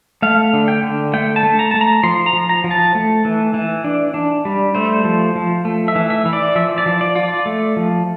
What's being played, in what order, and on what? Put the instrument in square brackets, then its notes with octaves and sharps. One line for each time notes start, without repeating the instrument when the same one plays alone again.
[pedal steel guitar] A3 F5
D3
G5
D3
A3 G5
A5
A3
A#5
A3 A5
A#5
F3 C6
A#5
F3
A#5
F3
A5
A3
E3
E3
D4
D4
G3
A3 C5
F3
F3
A3
E5
E3
E5
E3
D5
F3 E5
D5
F3
D5
F4
D5
A3
F3